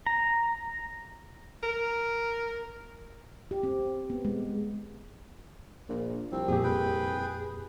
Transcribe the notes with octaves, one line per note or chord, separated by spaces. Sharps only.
A#5
A#4
G4
C4
B3
G#3
A#1 A#2
C2 F3 C4
F2 A#2 G4 G#4
B4 G5